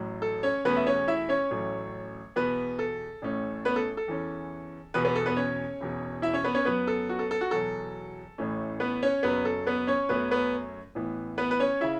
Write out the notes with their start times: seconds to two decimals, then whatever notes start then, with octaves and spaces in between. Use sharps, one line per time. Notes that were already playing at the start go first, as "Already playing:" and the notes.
Already playing: A1 A2 F#3
0.22 A4
0.43 C#4 C#5
0.65 E2 B2 A3 B3 C#4 B4
0.76 E5
0.87 C#4 C#5
1.08 E4 E5
1.29 C#4 C#5
1.51 A1 A2 F#3 A3 C#4
2.36 E2 B2 B3 B4
2.79 A4
3.22 A1 A2 A3 C#4
3.65 B3 B4
3.76 A4
3.97 A4
4.08 E2 E3 C#4
4.94 E1 E2 B2 B3 B4
5.05 B3 B4
5.15 A4
5.26 B3 B4
5.37 C#4 C#5
5.81 E1 E2 B2
6.22 E4 E5
6.33 C#4 C#5
6.44 B3 B4
6.55 C#4 C#5
6.65 F#2 F#3 B3 B4
6.87 A4
7.09 F#4
7.19 A4
7.31 A4
7.41 F#4
7.51 E2 B2 F#3 A4
8.38 A1 A2 E3 A3 C#4
8.80 B3 B4
9.03 C#4 C#5
9.23 F#1 F#2 F#3 B3 C#4 B4
9.45 A4
9.66 B3 B4
9.87 C#4 C#5
10.09 F#2 F#3 A3 B3 C#4 B4
10.31 B3 B4
10.95 A1 A2 E3 B3
11.38 B3 B4
11.51 B4
11.60 C#4 C#5
11.81 C#3 E4 E5